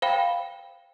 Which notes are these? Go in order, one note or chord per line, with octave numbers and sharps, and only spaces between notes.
C5 F5 G5 B5